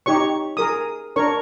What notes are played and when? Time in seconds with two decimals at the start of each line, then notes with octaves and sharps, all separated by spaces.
0.06 D#4 G4 C#5 C#6
0.57 G#4 A#4 D#6
1.16 D4 A#4 C#5 C#6